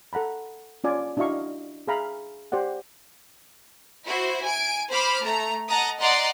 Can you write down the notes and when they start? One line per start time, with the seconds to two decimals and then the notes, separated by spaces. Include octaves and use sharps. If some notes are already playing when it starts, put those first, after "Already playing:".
0.13 A4 F#5 A#5 B5
0.84 C#4 F4 D5 G#5
1.17 D4 E4 F#4 D#5 F5 C#6
1.87 G#4 E5 F5 A#5 B5
2.52 G4 C5 D5 F#5
4.06 E4 F#4 C5
4.43 G#5 D7
4.90 C5 B5 D6 F6
5.24 A3 A#5
5.68 D#5 F#5 A5 A#5 D#6
6.00 D5 D#5 F#5 A#5 C6